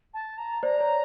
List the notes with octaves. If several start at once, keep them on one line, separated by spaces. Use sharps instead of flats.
A5
A#5
C5 D5 A#5
C#5